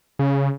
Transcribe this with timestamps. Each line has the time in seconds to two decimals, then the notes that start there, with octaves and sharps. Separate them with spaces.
0.19 C#3